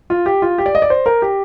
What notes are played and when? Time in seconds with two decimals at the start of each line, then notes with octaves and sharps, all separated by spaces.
0.10 F4
0.26 G4
0.42 F4
0.58 G4
0.66 D5
0.75 D#5
0.82 D5
0.90 C5
1.06 A#4
1.22 G4